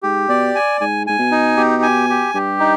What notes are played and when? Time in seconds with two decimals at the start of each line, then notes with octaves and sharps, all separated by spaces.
0.03 G#2 G4
0.29 B2 D5
0.55 G#5
0.81 G#2 G#5
1.07 G#2 G#5
1.19 B2
1.31 D#4
1.57 B2 G4
1.83 G#5
2.10 G4
2.34 G2 G4
2.60 D#4